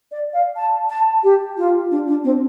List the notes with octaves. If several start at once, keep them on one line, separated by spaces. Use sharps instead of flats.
D5
F5
A5
A5
G4
F4
D4
D4
C4